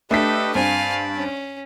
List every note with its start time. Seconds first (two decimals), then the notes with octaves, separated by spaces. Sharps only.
0.11 A3 D4 G4 A4 B4 D#5 B6
0.55 G2 C4 F5 G#5 A5 B5
1.16 C#4